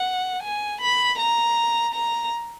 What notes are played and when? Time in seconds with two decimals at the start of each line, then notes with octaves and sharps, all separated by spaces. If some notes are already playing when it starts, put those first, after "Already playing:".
Already playing: F#5
0.43 G#5
0.81 B5
1.19 A#5
1.94 A#5